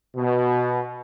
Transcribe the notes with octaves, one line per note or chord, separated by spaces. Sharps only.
B2